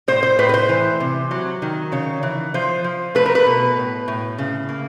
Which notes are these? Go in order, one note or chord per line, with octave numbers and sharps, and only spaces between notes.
A2 C5
C5
A2 B4
B4
C5
E3
C3
F#3
D#3
C#3 C#5
E3
F3 C5
F3
A3 B4
A#4
B4
B2
A2
A2
C#3
A#3